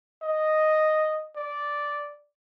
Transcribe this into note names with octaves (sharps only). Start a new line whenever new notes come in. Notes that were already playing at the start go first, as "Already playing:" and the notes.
D#5
D5